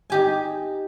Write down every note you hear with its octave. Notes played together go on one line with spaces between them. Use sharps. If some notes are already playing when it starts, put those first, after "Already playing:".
D#4 G4 G#5